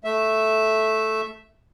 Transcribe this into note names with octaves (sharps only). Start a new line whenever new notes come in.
A3 E5